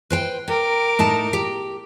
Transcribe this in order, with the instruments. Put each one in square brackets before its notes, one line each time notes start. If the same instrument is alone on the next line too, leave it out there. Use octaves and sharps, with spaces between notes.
[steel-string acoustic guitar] B4 C5 G5
[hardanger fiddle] A#4 D6 [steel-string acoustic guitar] G5
[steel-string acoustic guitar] A2 D#4 A5
G4